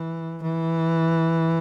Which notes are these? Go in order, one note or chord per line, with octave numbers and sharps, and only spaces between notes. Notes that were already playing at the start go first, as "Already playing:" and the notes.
Already playing: E3
E3